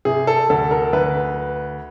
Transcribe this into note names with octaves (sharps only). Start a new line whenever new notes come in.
C3 G#4
A4
D2 A4
A#4
D2 B4